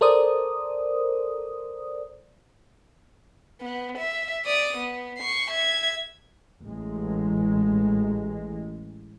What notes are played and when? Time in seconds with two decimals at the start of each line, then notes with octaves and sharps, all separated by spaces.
0.01 A4 A#4 C5 D5 D#6
3.61 B3
3.98 E5
4.45 D5 D#6
4.77 B3
5.18 C#6 C7
5.50 E5 G#6
6.64 A1 G#3